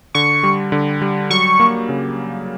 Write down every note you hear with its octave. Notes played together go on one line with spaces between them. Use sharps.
D3 C#6
G3
D3
G3
F#3 C#6
A#3
C#3